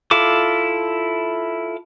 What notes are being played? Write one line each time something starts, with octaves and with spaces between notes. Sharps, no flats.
E4 F4 A4 D6